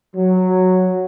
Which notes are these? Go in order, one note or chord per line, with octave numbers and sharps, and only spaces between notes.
F#3